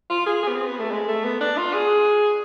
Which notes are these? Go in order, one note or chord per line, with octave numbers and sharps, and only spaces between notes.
F4
G#4
G#4
B3
C4
B3
A3
G#3
A3
B3
D4
F4
G#4